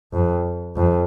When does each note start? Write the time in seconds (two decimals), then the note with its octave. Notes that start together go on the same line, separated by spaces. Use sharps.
0.13 F2
0.76 F2